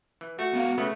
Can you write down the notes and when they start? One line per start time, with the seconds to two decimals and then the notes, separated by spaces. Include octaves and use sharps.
0.21 E3
0.39 A3 F#4
0.53 B3 A#4 F5
0.78 C#3 E3 A3 B3